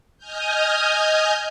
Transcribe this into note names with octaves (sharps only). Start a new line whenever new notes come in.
D#5 G#5 D#6 F6 G6